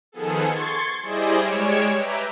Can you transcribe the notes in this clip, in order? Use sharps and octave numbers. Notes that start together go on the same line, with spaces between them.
D#3 F3 B3 G#4 A4
C6 C#6 G#6 A6
G3 E4 G#4 C5 D5 D#5
G3 G#3 C#5 G#6 D7 E7
B4 E5 G5 A#5 D6 B6